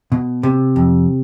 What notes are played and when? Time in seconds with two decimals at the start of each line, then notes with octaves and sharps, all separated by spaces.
0.12 B2
0.43 C3
0.76 F2